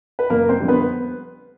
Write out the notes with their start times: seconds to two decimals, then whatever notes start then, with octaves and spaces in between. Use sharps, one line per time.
0.19 B4
0.30 F#1 A#3 A#4
0.49 C4 C5
0.58 F2 D3 G3 A#3
0.68 B3 B4